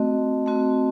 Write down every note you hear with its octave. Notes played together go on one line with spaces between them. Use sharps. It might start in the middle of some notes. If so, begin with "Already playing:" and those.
Already playing: A3 C4 F#4 D#5
A3 C4 F#4